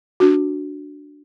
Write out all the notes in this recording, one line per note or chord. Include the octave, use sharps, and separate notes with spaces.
D4 F#4